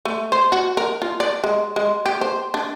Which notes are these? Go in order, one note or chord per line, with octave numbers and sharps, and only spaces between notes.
A3
C5
F#4
A#4
F4
D5
G#3
G#3
G4
C5
D4